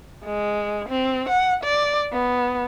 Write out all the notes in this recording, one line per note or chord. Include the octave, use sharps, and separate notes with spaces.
G#3
C4
F#5
D5
B3